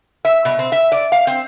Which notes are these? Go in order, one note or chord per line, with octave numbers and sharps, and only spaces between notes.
E5
B2
C4
E5
D5
F5
C4